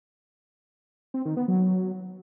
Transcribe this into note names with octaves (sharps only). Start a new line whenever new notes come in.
C4
D#3
B3
F#3